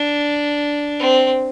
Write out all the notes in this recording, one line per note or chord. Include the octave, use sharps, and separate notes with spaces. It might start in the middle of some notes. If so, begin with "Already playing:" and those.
Already playing: D4
C4